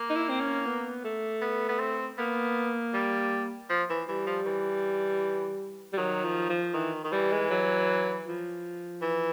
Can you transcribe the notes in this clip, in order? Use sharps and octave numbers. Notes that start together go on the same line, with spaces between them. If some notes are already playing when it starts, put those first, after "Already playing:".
Already playing: A#3
D#4
E4
C4
C#4
B3
A3
B3
B3
C4
A#3 B3
G3
F3
E3
E3 G3
F3
E3
G3
D#3 F#3
F3
F3
D#3 E3
D#3
E3 G3
G#3
F#3
F3
E3